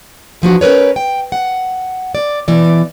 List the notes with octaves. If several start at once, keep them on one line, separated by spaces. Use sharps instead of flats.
E3 F3 D4 F#4
C#4 A#4 B4 C#5
G5
F#5
D5
B2 E3 D5